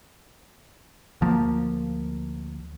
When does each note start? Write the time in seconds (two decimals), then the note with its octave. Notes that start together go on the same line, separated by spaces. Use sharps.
1.21 D2 F3 A#3